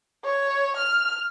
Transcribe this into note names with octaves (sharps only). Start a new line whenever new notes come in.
C#5
F6